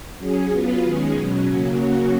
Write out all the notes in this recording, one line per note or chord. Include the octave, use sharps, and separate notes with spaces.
F#3 C#4 G#4
F#3 B3 F4 B4
D#3 G#3 C#4 G#4
B2 F#3 C#4
C#3 F#3 A#3 C#4 F#4